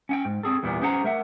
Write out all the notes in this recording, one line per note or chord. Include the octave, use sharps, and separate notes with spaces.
C#4 F#5 G5
G#2
C4 G#4 A4
E2 A#2 E3 G3 B3
C#4 G#4 C5 F#5 A#5
A3 A#4 E5 F#5